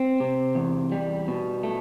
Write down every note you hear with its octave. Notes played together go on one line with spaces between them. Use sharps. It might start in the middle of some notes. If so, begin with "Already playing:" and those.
Already playing: C4
C3
E2
G3
B2
A3